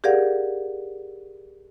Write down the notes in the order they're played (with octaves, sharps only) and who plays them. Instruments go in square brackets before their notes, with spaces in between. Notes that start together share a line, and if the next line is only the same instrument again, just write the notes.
[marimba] G4 G#4 A#4 D5 F5 F#5